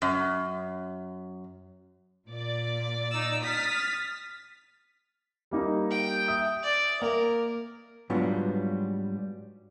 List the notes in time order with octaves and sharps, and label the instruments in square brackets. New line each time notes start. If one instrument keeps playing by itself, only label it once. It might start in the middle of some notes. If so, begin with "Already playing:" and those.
[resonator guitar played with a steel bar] F#2
[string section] A#2 D5
[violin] D#4 E6
[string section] D#6 F6 [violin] A6 B6
[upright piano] G3 A#3 D#4
[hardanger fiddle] G5
[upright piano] E5 D#6
[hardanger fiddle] D5
[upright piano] A#3 [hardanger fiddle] A#4
[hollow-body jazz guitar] G#2 F#3 G3 B3 D4 F4